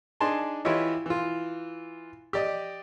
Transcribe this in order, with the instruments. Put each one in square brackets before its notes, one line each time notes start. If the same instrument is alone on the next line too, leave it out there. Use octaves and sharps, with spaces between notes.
[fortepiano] D4 D#4 G#4 G#5 A5 C6
E3 E4 F4 G4 C#5 D#5
E3 F4
G4 D5 D#5